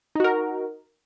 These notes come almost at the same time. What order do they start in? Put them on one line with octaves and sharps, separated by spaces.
D#4 F#4 A#4